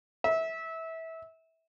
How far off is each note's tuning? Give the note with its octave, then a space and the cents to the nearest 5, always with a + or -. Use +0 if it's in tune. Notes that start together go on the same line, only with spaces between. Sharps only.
E5 -20